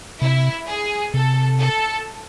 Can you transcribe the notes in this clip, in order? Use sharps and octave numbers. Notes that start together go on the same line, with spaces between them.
C3 E4
G#4
C3 A4
A4